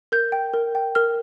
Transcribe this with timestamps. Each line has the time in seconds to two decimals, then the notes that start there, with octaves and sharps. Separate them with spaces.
0.12 A#4 G6
0.32 G5
0.54 A#4
0.75 G5
0.95 A#4 F6